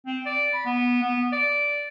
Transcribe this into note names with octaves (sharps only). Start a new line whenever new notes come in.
C4
D5
B5
B3
B3
D5